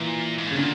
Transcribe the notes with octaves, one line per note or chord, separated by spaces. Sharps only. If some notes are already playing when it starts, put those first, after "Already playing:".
Already playing: A#2 E3
G#2
A2
C#3
A#2 D3